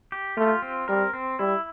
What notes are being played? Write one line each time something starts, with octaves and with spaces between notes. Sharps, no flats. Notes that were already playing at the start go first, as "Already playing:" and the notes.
G4
A3 F4
C4
G3 A#4
C4
G3 E4